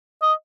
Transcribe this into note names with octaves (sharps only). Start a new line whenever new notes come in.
D#5